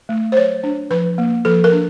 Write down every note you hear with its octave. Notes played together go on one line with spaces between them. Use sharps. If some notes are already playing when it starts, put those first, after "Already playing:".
A3
C5
F#3 C#5
D4
F3 B4
A#3
F3 A4
A#4
D4